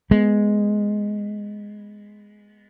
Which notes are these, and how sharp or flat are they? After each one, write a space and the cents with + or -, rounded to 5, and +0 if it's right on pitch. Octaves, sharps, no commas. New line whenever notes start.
G#3 +0 B3 +0